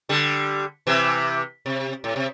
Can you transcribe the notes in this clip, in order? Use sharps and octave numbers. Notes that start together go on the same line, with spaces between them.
D3 G3
C3 E3
C3
A2
C3